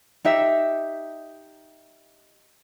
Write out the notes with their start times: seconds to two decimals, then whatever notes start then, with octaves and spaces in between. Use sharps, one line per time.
0.25 D#4 G4 E5